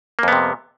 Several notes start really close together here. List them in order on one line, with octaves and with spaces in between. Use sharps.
A#3 F2 B3 C3